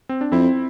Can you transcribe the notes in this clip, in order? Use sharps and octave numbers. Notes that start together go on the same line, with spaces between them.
C4
D4
F2 C4 E4